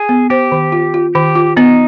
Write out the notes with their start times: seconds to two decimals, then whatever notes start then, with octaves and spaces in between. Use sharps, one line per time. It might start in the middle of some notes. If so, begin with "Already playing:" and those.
Already playing: G#4
0.09 B3
0.30 G4 C5
0.52 D#3
0.72 F4
0.94 F4
1.15 D#3 G4
1.35 F4
1.57 B3 D#4